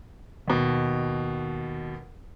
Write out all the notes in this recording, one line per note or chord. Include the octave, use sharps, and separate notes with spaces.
D#2 B2